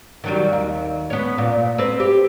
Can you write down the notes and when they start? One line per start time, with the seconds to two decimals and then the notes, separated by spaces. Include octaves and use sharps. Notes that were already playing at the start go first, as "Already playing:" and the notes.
0.24 D#3 F#3 G3
0.53 D#2
1.10 B3 C#4
1.38 A#2
1.78 C4 B4
2.00 G4